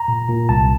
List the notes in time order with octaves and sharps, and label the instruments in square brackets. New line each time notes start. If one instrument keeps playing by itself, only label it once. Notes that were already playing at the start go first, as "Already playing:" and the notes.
Already playing: [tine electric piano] A#5
A#2
A#2
C2 A5